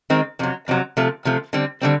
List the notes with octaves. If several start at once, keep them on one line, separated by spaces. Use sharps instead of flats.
D#3 G#3 C4
F2 C3 F#3
F2 C3 F#3
C3 F3 A3
C3 F3 A3
D3 G3 C4
D3 G3 C4